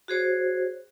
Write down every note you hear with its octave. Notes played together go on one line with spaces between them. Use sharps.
F#4 G#4 C5 C#5